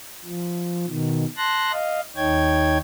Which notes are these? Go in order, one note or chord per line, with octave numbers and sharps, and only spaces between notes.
F3
B2 D#3
A5 C6 F#6 A#6
D#5 F5
D#2 D#4 C#5 G5 G#6